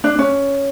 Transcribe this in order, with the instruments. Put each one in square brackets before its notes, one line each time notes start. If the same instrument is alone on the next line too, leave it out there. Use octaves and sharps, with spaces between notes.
[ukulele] D4
C#4